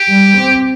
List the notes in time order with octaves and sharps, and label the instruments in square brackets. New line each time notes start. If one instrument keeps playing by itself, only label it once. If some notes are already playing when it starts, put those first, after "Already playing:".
Already playing: [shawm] G4
[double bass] G3
C4